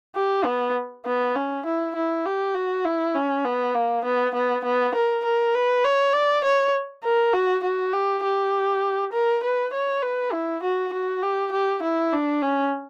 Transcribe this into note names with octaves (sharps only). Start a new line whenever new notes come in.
G4
B3
B3
C#4
E4
E4
G4
F#4
E4
C#4
B3
A#3
B3
B3
B3
A#4
A#4
B4
C#5
D5
C#5
A#4
F#4
F#4
G4
G4
A#4
B4
C#5
B4
E4
F#4
F#4
G4
G4
E4
D4
C#4